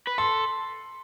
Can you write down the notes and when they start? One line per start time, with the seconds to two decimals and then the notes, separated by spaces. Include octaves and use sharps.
0.07 B4
0.18 A4 C6